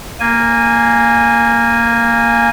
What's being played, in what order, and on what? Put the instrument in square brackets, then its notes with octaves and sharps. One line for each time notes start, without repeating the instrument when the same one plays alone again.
[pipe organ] A#3 G#5